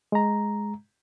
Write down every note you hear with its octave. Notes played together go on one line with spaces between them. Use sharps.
G#3 A#5